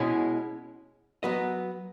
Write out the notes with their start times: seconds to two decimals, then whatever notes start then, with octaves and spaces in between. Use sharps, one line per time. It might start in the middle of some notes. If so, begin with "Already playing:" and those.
Already playing: B2 G#3 C#4 E4 G#4
1.23 F#3 B3 F#4 B4 D#5